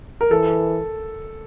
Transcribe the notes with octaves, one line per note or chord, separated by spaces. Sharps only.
A#4
E3 A4